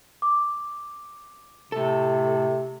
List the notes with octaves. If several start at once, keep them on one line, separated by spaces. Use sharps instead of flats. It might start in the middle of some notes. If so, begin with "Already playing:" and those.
D6
A2 C3 A4